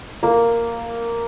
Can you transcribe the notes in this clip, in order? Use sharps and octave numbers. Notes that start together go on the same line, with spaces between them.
A#3